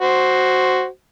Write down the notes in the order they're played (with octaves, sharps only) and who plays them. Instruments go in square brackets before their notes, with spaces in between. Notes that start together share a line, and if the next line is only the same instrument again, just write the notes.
[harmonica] F#4 C5